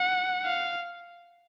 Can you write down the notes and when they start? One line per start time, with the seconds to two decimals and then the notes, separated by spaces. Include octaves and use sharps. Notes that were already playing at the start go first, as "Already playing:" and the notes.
Already playing: F#5
0.45 F5